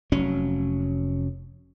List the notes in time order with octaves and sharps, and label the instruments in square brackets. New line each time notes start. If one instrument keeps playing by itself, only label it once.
[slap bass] F1 F#3 C#4